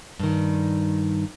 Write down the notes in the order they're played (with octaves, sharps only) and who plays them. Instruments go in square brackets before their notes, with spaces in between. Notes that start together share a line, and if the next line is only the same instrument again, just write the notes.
[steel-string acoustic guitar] G2 D#3